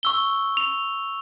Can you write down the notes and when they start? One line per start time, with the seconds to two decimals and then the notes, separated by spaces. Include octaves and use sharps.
0.03 C#6 E6 G7
0.57 F7